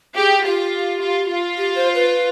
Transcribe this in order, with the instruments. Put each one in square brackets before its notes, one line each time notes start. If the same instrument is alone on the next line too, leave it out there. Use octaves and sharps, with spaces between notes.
[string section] G4 [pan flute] G#4
[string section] F4 [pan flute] G4
[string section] F4
F4
[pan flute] G4
C5
B4